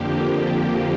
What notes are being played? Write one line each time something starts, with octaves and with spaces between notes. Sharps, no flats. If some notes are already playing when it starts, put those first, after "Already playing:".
Already playing: F2 D3 F3 A#3 G4